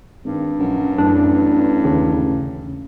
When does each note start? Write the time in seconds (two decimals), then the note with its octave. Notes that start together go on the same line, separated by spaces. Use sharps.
0.24 G#1 G2
0.59 A#1 F#2
0.98 A1 F#2 D4
1.85 D#2 C#3